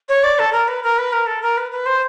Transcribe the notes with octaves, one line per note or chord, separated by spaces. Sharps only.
C#5
D5
A4
A#4
B4
A#4
B4
A#4
A4
A#4
B4
B4
C5